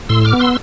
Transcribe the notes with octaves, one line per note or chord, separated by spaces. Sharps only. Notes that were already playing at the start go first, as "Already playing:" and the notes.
A2 C6 E6
D6 F6
B3
C6 E6